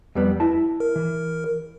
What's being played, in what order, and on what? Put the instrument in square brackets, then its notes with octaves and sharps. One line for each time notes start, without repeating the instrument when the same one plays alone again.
[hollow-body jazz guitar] F2 G3 B3
E4 E5 A5
[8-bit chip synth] A#4
[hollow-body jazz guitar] E3